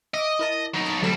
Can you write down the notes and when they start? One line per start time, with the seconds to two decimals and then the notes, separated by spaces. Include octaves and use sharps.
0.14 D#5 E5 D6
0.39 E4 A#4 A5
0.74 F#3 D#4
0.86 A5 A6
1.03 D2 F#3 G3 A4 E7